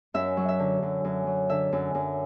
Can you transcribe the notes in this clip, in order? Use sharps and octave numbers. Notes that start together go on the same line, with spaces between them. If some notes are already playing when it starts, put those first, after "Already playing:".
F#2 E5
F#3
E5
D3
F#2
F#2
F#3
D3 E5
F#2
F#2